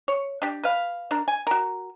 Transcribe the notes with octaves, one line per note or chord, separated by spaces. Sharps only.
C#5
D4 G4
B4 F5
D4 A#4
G#5
F#4 A#4